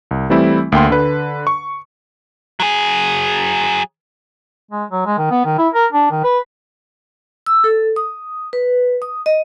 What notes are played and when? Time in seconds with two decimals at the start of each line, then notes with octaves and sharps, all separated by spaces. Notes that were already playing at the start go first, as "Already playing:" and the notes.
0.11 C2
0.30 E3 G3 A3 C4 E4
0.72 D2 A#3 G5 C6
0.90 D3 B4
1.47 C#6
2.60 F#3 G#4
4.72 G#3
4.91 F#3
5.06 G#3
5.18 D#3
5.31 B3
5.45 D#3
5.58 E4
5.75 A#4
5.93 D4
6.11 D#3
6.24 B4
7.46 E6
7.64 A4
7.96 D#6
8.53 B4
9.02 D#6
9.26 D#5